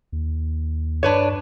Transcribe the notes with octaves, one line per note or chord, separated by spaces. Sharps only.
D#2
G2 D4 B4 C#5